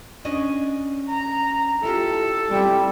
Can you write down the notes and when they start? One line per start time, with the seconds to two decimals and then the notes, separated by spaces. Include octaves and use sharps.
0.25 C#4 D4 D#5
1.09 A#5
1.83 E4 F4 G4 A4
2.51 G3 C4 E4